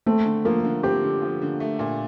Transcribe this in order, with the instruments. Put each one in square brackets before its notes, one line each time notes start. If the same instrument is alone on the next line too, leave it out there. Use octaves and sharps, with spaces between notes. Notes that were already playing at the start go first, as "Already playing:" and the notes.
[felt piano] A3 [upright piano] C4
[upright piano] D3
[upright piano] F3 [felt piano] A#3
[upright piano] D3
[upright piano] C4 [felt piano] G4
[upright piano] D3
F3
D3
A3
A#2